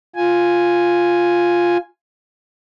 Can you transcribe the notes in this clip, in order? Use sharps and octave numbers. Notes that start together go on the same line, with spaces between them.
F4 G#5